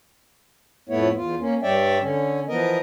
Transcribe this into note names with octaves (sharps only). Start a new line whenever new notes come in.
F2 A2 A3 B3 E4 C#5
E2 F4
A#3 C#4
G2 G3 C#5 D5 E5 G5
D3 C#4
E3 F3 B3 A#4 D#5